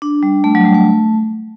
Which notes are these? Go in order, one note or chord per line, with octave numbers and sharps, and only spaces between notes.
D4
G3
A3
F#3
G3
A3